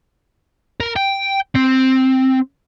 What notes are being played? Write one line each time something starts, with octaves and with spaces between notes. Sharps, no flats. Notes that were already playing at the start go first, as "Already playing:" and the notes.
A#4
G5
C4